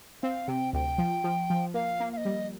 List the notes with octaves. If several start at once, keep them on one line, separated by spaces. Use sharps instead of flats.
C4 F5
C3 G5
D2 G5
F3
F3
F3
A#3 F5
A#3
F5
D#5
G3